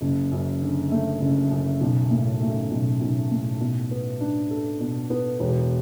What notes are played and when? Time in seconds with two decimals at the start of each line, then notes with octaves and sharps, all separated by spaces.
0.01 F#1
0.32 F#2
0.62 D3
0.92 A3
1.21 F#1
1.51 F#2
1.80 B1
2.11 A2
2.42 A3
2.71 B1
3.01 B1
3.31 A2
3.61 B2
3.91 B3
4.20 D4
4.51 A4
4.80 B2
5.10 B3
5.40 E1